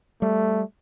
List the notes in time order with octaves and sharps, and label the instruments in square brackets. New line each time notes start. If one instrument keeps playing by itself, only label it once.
[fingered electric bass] G3 [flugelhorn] A3